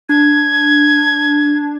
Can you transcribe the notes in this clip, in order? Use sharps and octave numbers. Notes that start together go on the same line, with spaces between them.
D4 G#6